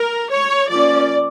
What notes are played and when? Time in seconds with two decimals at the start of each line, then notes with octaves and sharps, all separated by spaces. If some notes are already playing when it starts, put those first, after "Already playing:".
Already playing: A#4
0.31 C#5
0.69 F3 A#3 C#4 D5